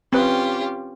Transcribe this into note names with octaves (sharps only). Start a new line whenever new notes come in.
C4 C#4 F4 G4 B4